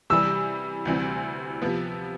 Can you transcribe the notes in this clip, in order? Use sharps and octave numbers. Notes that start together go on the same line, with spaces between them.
C3 E3 G3 E6
D2 C3 E3 G3 C4
C3 F3 B3